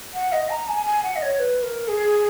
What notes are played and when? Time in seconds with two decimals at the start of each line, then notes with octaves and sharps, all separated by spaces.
0.14 F#5
0.32 D#5
0.50 A#5
0.68 G#5
0.86 G#5
1.03 F#5
1.16 D#5
1.22 C#5
1.39 B4
1.63 A#4
1.88 G#4